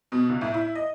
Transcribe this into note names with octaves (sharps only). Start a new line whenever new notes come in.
B2
C#2
A2
E4
D#5